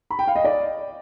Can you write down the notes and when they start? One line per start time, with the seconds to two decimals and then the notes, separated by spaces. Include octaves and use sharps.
0.10 B5
0.19 G5
0.27 F5
0.36 D#5
0.44 D5